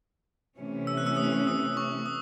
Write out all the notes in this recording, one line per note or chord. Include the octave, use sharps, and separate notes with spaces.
C3 E3 A3 C#4
E6
F#6
E6
D#6
D#6
C#6
D#6